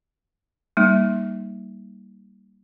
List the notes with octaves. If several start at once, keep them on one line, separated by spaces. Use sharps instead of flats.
G3 A#3 D#4